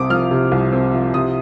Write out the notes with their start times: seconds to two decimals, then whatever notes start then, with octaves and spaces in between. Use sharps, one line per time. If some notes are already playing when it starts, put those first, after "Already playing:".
Already playing: C2 C3 C4 D6 D#6
0.10 F3 F6
0.31 C3
0.52 C2
0.73 C4
0.93 F3
1.14 C3 D#6